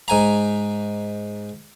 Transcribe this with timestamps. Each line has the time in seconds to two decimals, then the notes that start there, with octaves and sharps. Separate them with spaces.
0.08 G#2 G#5 A#5